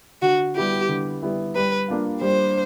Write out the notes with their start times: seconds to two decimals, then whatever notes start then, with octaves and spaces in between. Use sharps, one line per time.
0.22 D3 F#4
0.55 G3 B3 E4 G4
0.89 D3
1.22 G3 B3 E4
1.55 G3 B4
1.88 A#3 D4 F4
2.21 G3 C5